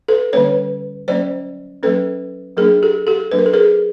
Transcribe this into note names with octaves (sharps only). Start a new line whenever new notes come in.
A4 B4
D3 G3 A#3 C#4 B4 C#5
F#3 A#3 C#4 C5 D5
F#3 A#3 C#4 A4 B4
F#3 A#3 D4 G#4 A#4
G4 A4
G4 A4
F#3 A#3 D4 B4
A#4
A4
G#4 A#4